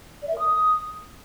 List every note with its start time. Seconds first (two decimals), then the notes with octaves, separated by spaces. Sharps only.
0.21 D5
0.27 E5
0.32 A#4
0.38 D#6